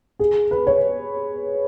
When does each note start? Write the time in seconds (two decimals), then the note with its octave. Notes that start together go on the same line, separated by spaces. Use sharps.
0.20 G#4
0.51 B4
0.67 C#5